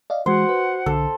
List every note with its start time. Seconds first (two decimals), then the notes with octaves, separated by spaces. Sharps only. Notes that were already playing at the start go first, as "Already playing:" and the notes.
0.10 D5 D#5 F5
0.26 E3 G#3 F#4 C5 F#5
0.49 B4
0.86 B1 D3 A4